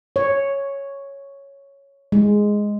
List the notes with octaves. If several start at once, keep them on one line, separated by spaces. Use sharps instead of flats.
C#5
G#3